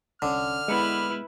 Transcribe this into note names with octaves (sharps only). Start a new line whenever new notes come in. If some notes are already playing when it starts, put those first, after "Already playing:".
C2 D3 C#4 F6
G#3 B3 E4 B4